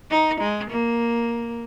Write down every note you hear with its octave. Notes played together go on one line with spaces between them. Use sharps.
D#4
G#3
A#3